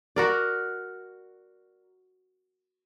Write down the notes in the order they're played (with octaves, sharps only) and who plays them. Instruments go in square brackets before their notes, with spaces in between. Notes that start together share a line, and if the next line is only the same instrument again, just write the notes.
[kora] F#4 A#4 D5